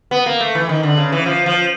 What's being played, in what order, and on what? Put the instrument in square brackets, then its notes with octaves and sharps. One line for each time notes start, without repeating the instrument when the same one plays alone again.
[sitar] B3
A#3
A3
E3
D#3
D3
C#3
E3
F3
F3